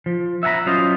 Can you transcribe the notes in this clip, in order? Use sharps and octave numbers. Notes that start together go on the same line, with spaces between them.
F3
E5 F#5 G#5 A#5 B5
F#3 C#4 F4 C5 D#5